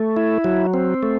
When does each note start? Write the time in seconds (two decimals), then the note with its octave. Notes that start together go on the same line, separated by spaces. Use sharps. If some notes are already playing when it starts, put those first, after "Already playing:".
Already playing: A3
0.16 E4
0.44 F#3
0.74 C4
1.03 A3